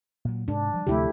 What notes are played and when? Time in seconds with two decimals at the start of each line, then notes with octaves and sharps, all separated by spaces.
0.25 A#2 F#3
0.48 G#2 C3 D4
0.74 F3 G3
0.87 D2 C3 F3 A3 E4 G4